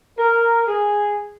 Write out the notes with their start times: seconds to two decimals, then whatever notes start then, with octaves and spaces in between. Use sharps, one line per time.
0.19 A#4
0.68 G#4